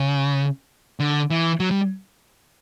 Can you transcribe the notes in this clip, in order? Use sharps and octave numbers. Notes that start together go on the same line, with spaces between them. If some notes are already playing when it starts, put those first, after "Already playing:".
Already playing: C#3
D3
E3
F#3
G3